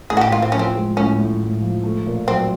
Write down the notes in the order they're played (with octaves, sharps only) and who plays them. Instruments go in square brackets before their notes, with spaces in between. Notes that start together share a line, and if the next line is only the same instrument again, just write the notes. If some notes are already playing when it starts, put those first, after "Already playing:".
[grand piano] A2 [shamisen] G#4
[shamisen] F#4
G4
[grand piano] A2 [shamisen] F4
[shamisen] C4
[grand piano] F3 [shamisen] C#4
[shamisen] C4
[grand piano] G#3
[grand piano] A2 [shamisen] C#4
[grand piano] A2
A2
F3
A3
A#2
[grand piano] F#3 [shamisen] C4